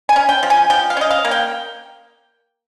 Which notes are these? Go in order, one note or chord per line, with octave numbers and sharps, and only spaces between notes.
G#5
C#4
G5
F3
G#5
F3 G5
F5
C#4 D#5
F5
A#3
G5